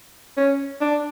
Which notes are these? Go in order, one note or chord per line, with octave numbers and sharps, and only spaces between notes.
C#4
D4